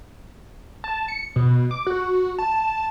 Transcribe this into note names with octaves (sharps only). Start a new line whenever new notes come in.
A5
C#7
B2
D6
F#4
A5